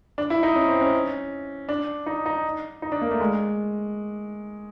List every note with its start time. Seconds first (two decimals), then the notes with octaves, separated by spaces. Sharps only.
0.18 D4
0.30 E4
0.43 D#4
0.56 C#4
0.68 C4
0.81 C#4
1.69 D4
2.06 D#4
2.26 D#4
2.82 D#4
2.92 D4
3.02 A#3
3.11 A3
3.20 G#3